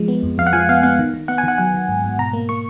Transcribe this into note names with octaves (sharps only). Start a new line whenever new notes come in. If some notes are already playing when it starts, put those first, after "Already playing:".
Already playing: F3 G#3
B3
F2
F2 F5
F#5
F3 G#5
B3 F5
B3 F#5
D#3
D#3
B3 F#5
G#5
D#3 F#5
F#3 F#5
D#3
G#2
G#2
B2 A#5
A#3
A#3 C#6